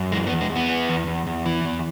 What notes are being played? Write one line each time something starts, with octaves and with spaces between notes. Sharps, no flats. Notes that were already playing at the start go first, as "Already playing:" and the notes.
Already playing: F#2
E3 G#3
B3
E2
G#3
E2
B3
E3
E2
E2
E2
E3
E2